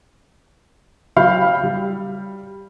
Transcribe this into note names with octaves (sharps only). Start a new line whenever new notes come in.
F#3 G4 F5 B5 G6
G3